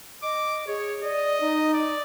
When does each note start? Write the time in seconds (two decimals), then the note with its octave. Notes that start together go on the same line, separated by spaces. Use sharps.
0.23 D#5 D6
0.67 G#4 C#5
1.03 D5 D#5
1.41 D#4
1.73 D5